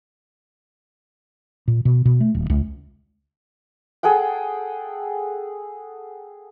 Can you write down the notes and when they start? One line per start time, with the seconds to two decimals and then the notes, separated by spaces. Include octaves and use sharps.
1.68 A#2
1.85 B2
2.05 B2
2.21 A3
2.35 D#1
2.50 C#2
4.03 G#4 A4 F#5 G5